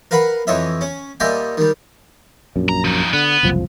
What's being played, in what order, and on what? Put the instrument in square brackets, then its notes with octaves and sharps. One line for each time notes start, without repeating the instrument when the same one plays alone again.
[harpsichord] A#4 B4 F5 F#5 B5
F2 E3 C#5 D#5 E5
C#4
A#2 G3 D#5 E5 G5 G#5
D#3 G3
[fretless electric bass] A#1 F#2
[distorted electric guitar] A#5
F3 D#4
[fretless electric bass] D3 [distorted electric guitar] B3
[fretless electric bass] F#1 C2 F3